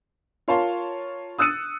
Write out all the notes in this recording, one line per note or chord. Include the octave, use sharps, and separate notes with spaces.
F4 A#4 C#5 F5 A5 C6
D#6 E6 F#6 A6 C#7 D#7